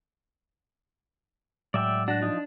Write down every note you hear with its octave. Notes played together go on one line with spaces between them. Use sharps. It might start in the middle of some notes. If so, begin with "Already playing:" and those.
A2 F#3 G#3 D5 E5 G5
D4 F#4
F3 D#4